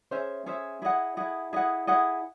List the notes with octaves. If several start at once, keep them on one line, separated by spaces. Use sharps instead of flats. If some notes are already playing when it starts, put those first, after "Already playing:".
C#4 G#4 C5 E5
C#4 G#4 C5 E5
E4 G#4 D#5 F#5
E4 G#4 D#5 F#5
E4 G#4 D#5 F#5
E4 G#4 D#5 F#5